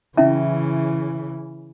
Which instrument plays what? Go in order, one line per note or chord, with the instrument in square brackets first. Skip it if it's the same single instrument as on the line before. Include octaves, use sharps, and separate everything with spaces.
[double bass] C#3 E3 [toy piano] C#4 E4 E5